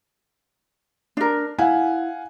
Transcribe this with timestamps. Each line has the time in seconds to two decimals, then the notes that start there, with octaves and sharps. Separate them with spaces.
1.17 D4 A#4
1.59 E4 F5 F#5 G#5